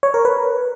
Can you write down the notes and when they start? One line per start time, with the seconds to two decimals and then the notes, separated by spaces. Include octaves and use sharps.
0.03 C#5
0.14 A#4
0.25 B4